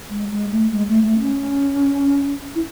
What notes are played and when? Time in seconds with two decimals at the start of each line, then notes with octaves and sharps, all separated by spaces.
0.10 G#3
0.31 G#3
0.51 A3
0.72 G#3
0.88 A3
1.04 A3
1.20 C#4
2.55 E4